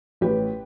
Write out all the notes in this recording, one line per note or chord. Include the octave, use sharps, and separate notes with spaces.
A1 G4 B4